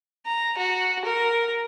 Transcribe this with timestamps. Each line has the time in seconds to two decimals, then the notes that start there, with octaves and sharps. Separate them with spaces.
0.26 A#5
0.58 F#4
1.05 A#4